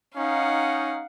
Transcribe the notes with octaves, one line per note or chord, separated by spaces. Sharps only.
C#4 D#4 F5 F#5